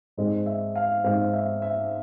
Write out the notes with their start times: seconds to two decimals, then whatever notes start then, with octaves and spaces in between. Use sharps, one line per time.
0.17 G#2 G#3 C4
0.46 E5
0.76 F5
1.04 G#2 G#3 C4 F5
1.33 E5
1.62 E5